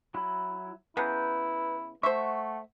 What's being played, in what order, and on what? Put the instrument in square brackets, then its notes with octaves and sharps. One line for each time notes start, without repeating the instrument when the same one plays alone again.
[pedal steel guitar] F#3 E4
[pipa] C#3 B3 [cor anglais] E4 [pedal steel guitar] B4 A#5 G6
[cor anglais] A3 [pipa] C5 E5 [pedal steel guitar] F#5 C#6